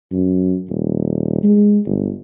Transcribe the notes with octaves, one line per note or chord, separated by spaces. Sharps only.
F#2
D#1
G#3
G1